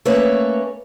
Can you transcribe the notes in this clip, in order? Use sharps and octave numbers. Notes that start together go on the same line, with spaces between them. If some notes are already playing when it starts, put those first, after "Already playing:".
A3 A#3 C#4 B4 C#5